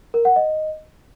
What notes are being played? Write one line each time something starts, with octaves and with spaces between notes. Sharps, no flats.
A#4
F#5
D#5